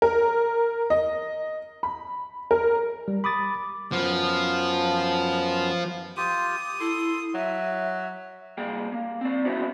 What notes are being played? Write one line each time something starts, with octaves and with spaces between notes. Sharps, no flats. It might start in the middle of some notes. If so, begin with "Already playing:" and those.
A#4
D#5
B5
A#4
G3
B5 D6 D#6 A6
F#2 F3 B3
F4 G4 D#6
E4 A4 C6
F#3 E5
G3 A#3 G#4 G5
A#3
C4 D5
B3 C#4 E4 F#4 C5